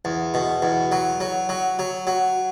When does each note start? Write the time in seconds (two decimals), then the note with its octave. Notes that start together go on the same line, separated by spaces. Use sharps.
0.05 E2
0.34 B2
0.62 E2
0.92 F#3
1.20 F#3
1.49 F#3
1.79 F#3
2.07 F#3